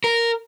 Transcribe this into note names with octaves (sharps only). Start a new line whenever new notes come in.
A#4